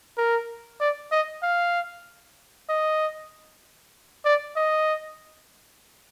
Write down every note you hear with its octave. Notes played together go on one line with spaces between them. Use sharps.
A#4
D5
D#5
F5
D#5
D5
D#5